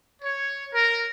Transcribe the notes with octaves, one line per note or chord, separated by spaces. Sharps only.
C#5
A#4